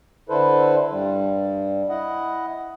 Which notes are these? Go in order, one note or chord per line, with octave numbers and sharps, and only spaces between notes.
D3 E4 A4 B4 C5
G2 G3
E4 D#5 F#5